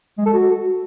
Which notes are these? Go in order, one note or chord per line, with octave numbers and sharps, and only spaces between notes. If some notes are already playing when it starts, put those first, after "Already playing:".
G#3
A4
F#4